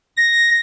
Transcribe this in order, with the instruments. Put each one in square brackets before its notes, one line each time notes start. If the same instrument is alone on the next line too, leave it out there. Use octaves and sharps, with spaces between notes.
[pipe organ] A#6